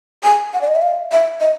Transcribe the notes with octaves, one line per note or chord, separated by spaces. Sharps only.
G#5
F#5
D5
D#5
E5
F5
E5
D#5